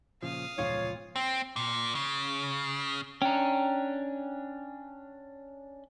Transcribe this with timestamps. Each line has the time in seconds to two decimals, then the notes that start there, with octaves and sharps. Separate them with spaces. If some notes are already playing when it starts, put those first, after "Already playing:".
0.23 A#2 C#3 F3 F5 D#6
0.58 E1 C#2 A#2 F3 F4 C#5
1.16 C4
1.56 A#2
1.95 C#3
3.22 C#4 D4 G5 A#5